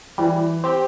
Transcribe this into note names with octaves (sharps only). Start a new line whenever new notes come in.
E3 G3
C4 G4